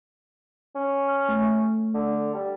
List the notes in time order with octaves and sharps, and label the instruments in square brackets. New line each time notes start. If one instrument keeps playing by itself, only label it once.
[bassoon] C#4
[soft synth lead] F6
A3
[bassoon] D3
G3